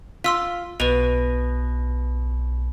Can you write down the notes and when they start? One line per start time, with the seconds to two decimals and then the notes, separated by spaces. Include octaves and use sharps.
0.24 F4 C6 E6 B6
0.80 B1 B2 B4 F7